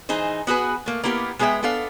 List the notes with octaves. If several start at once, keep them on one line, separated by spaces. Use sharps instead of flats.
E3 D#4 G#4 C5
B3 F#4 G#4 B4
A3 A#3
A#3 B3 E4 G4 A#4
G#3 B3 G#4 C5 E5 G5
B3 D4 A4 F5